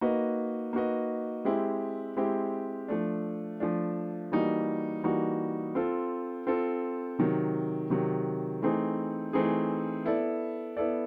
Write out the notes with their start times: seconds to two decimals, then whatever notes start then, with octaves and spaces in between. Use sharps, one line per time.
0.01 A#3 D#4 F#4 B4 D#5
0.73 A#3 D#4 F#4 B4 D#5
1.45 G#3 C4 E4 G4
2.17 G#3 C4 E4 G4
2.88 F3 A3 D4
3.60 F3 A3 D4
4.32 E3 G3 A#3 D#4 F#4
5.03 E3 G3 A#3 D#4 F#4
5.75 C4 F4 A4
6.47 C4 F4 A4
7.19 C3 D#3 F#3
7.90 C3 D#3 F#3
8.62 E3 A3 C4 D#4 G#4
9.33 E3 A3 C4 D#4 G#4
10.05 B3 E4 A4 D5
10.77 B3 E4 A4 D5